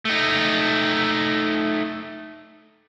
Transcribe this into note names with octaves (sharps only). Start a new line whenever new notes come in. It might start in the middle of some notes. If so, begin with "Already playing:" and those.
A3 D#4